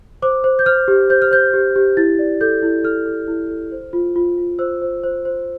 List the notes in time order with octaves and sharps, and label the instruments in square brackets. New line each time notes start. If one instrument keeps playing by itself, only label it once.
[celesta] C5 D6
C5
G6
C5 F6
G4
C5 G6
F6
C5 G6
G4
G4
E4 A6
D5
A4 G6
E4
A4 F6
A4
E4
A4
C5
F4
F4
F4
C5 E6
C5
C5
C5